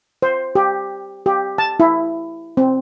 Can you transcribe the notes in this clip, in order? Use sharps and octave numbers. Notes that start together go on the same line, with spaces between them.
C5
G4
G4
A5
E4
C4